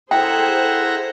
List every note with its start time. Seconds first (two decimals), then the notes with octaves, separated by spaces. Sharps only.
0.11 E4 G#4 A4 C5 F#5 G5 A#5